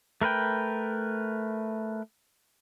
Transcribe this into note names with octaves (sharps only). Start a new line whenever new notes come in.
A3 A#4 B4 G5